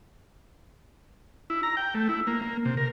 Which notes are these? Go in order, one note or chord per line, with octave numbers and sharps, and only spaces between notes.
E4
A#5
G5
A3
E4
A#3
A#3
C3
A#4